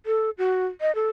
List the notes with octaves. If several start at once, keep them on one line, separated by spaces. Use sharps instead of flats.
A4
F#4
D#5
A4